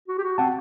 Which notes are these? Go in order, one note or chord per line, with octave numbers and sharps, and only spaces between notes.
F#4
G4
F#4
C4 F#5 A5